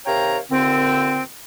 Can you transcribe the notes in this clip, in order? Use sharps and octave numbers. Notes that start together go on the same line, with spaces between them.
C3 D#3 C#5 F5 G5 A#5
D#2 A#2 D3 C4